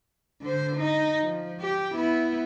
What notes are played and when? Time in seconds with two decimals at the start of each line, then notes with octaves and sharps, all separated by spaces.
0.42 D3 C5
0.76 D#4
1.22 F3
1.61 G4
1.95 B3 E4